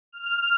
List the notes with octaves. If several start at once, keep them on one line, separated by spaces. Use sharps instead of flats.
F6